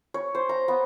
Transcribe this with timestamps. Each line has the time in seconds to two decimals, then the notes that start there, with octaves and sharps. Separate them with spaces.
0.14 C#5
0.35 C5
0.49 A#5
0.68 B3